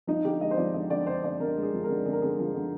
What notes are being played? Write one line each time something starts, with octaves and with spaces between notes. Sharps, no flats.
F3 D#4
D3 G4
G#3 D#5
C5
F3 D5
D3 D#5
D3 D5
D3 C5
D3 D5
D3 A#4
G#3
G#4
F3
D3 A#4
D3 G#4
A#4
D3 G#4
F3
D3